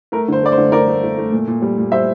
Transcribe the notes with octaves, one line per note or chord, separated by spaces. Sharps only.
A3 A#4
D3 C5
A3 D5
C5
D3
D3 A#4 D5
A3
A3
A3
A#2
A#2
G3
A#2
G3 C5 E5